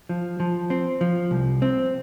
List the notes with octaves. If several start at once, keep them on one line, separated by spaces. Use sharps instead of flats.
F3
F3
C4
F3
C2
C4